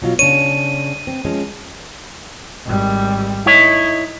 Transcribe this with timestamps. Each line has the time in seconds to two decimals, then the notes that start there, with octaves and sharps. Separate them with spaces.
0.02 B2 F#3 F4
0.19 C#3 D4 C#5 D#7
1.07 C4
1.25 F3 G#3 C#4
2.65 G#1 G3
3.46 D#4 E4 C#5